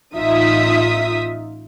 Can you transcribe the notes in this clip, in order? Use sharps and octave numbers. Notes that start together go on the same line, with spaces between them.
A1 D#4 F4 E5 D#6 B6